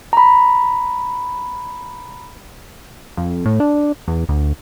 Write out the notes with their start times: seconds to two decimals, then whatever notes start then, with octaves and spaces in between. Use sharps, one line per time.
0.13 A#5 B5
3.17 F2
3.46 A2
3.60 D4
4.08 E2
4.29 D2